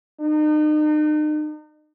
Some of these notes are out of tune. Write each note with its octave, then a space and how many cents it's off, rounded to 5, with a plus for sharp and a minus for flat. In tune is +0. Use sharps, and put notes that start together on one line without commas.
D#4 -40